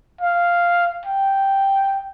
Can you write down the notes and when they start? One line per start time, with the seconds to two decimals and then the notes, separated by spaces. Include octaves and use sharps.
0.21 F5
1.05 G5